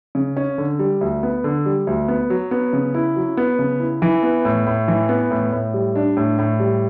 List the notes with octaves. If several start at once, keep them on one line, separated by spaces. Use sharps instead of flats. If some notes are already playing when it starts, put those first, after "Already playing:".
C#3
C#4
D3
G3
D2
B3
D3
G3
D2
B3
F#3
B3
C#3
E4
F#3
B3
C#3
E4
E3
B3
A2
A2
E3
B3
A2
A2
G3
D4
A2
A2
G3